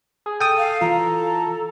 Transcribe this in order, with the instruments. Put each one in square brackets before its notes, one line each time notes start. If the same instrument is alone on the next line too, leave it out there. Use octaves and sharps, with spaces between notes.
[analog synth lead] G#4
[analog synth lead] A4 [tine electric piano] G5 D#6
[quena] F5
[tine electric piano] E3 F4 [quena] A#5